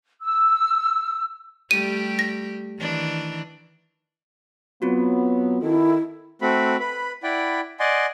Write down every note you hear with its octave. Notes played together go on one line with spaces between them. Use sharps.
E6
G3 A3 G4 D#7
A#6
D#3 E3 D4
F#3 B3 C4 F4 F#4
D#3 E4 A4
A3 C4 F#4 B5
B4 B5
E4 D5 F#5 G5 B5
D5 D#5 F#5 G#5 C6